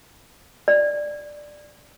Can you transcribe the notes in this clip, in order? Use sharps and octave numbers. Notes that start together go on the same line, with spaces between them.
D5